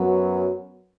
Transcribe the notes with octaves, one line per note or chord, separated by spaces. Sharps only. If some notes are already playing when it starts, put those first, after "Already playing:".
Already playing: F#2 F#3 B3